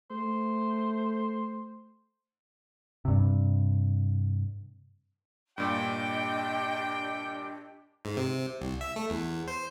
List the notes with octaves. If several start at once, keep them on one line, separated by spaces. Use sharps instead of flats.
A3 C5
G2 C3
G2 A#2 D4 G4 D#5 G5
G#2
C3
C2
E5
A3
E2
C5